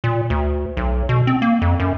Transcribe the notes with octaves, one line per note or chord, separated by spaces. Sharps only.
A#2
D2
B1
B2
C4
A#3
F2
F#2